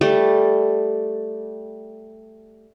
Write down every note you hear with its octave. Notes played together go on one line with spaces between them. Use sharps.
G3 A3